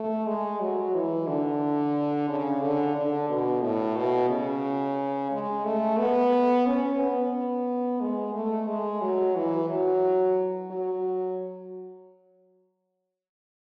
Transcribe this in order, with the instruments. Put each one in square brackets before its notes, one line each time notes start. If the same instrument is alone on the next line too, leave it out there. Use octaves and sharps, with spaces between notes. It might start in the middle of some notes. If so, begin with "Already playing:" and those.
Already playing: [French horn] A3
G#3
F#3
E3
D3
C#3
D3
D3
B2
A2
B2
C#3
G#3
A3
B3
C#4
B3
G#3
A3
G#3
F#3
E3
F#3
F#3